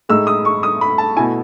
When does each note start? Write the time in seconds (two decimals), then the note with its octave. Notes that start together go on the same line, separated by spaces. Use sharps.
0.09 A2 G#3 D#4 E6
0.27 D#6
0.45 C#6
0.63 D#6
0.81 B5
0.98 A5
1.16 B2 A3 E4 G#5